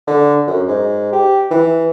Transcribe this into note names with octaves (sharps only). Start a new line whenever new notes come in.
D3
F#2
G#2
G4
E3